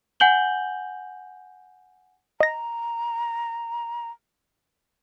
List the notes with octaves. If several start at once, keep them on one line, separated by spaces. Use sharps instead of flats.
F#5 G#5 G6 F#7 G7
D#5 A#5 A#6